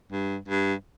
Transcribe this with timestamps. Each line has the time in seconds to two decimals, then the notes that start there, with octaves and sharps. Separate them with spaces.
0.12 G2
0.49 G2